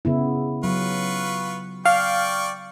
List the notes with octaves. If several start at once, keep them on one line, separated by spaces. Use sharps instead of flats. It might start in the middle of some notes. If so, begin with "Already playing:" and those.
C#3 B3 E4
F#3 F4 B4 C#6
D5 F5 G5 C#6